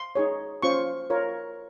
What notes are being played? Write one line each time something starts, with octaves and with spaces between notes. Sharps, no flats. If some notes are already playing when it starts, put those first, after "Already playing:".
Already playing: C6
D#4 G#4 C#5
C#4 F4 C5 C#6
F4 A#4 C#5